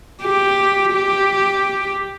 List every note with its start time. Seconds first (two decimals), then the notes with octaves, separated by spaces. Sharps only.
0.22 G4
0.93 G4